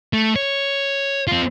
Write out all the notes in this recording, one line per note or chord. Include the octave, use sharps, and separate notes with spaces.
A3
C#5
C4 F4